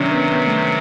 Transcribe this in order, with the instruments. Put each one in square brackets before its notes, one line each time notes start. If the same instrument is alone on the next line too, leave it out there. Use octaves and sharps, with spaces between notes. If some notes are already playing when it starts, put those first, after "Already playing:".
Already playing: [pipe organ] C3 D#3 F#3 [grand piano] C#4 D4
[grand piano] B3
B3
A3